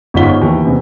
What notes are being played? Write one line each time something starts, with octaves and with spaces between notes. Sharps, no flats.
G1 G#2 C#4 F4 B6 G7
D#2 E3
E2 C3